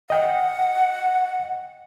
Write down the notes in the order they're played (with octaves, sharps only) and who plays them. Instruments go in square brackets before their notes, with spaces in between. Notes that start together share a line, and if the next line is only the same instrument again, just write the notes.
[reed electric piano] D#5 G5 [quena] F#5